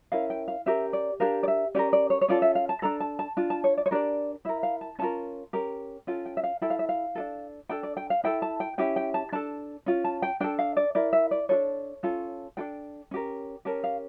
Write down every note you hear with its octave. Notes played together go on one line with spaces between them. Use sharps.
C#4 E4 A#4 F5
G5
F5
C#4 G4 A#4 E5
D5
D4 G4 A#4 F5
D5
E5
C#4 G4 A#4 D5
D5
C#5
C#5
C#4 F4 A4 D5
E5
F5
A5
D4 A4 A#5
A5
A5
D4 F4
A5
C#5
D5
C#5
D4 G4 A#4 D5
E4 A#4 E5
F5
A5
C#4 F4 A#4 A5
C#4 G4 A#4
C#4 F4 A4 G5
G5
E5
F5
E4 A4 G5
F5
E5
F5
D4 F4 A4
D4 A4 G5
D5
G5
F5
E4 A4 G5
A5
G5
C#4 E4 G4 G5
G5
A5
D4 A4 A5
C#4 F4
A5
G5
D4 A4 G5
F5
D5
E4 A#4 D5
E5
D5
D4 F4 A4 C#5
C#4 F4 A4
D4 F4 A4 G5
C#4 G4 A#4
C#4 G4 A#4 A5
F5